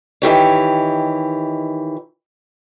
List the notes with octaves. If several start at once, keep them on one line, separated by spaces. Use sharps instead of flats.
D#3 E3 G4 C#5